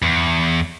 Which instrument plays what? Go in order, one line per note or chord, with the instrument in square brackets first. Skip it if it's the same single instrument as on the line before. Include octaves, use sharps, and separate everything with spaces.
[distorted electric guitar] E2